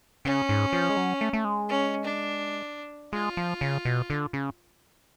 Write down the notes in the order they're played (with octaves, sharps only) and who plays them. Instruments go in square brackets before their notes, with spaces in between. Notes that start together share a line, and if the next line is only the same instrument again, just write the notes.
[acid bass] C#3 [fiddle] C#4
[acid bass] G#2
F3
G#3
F#3
A3
A3
G#3
[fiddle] C#4
D4
[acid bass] G#3 [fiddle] F4
[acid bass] F3
C#3
B2
D3
C#3